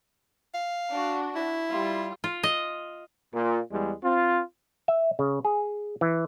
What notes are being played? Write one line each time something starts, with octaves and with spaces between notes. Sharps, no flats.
F5
D4 F#4
E4
G3 F4
F4
D#5
A#2
E2 G3 G#3
C4 F4
E5
C#3
G#4
E3